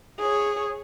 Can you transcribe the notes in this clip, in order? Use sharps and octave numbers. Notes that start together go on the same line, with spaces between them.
G#4 C#5